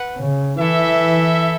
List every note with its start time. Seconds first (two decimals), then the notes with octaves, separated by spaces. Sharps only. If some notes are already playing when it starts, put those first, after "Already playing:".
Already playing: B4 F#5
0.17 C#3
0.58 E3 E4 A4 E5